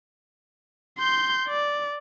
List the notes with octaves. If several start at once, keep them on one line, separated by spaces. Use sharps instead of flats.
C6 G6
D5